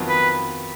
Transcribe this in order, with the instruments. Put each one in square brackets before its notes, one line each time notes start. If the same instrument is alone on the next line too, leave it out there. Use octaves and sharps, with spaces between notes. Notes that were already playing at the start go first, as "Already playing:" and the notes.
Already playing: [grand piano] F2 D#3 F#3 B3 F4
[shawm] B4